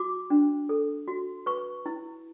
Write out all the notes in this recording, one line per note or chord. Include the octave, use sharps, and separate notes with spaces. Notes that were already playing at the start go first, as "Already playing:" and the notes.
Already playing: F#4 D6
D4
A4
F#4
B4 C#6
E4